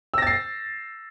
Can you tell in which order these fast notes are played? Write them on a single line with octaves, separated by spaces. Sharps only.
E6 A#6 A6 C7